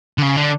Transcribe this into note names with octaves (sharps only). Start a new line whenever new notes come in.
D3
C#3
D3